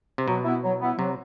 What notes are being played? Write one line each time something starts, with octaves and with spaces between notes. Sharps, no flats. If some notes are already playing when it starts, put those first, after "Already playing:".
C3
B2 F#3
B3 E4
F#3
B3 E4
C3 F#3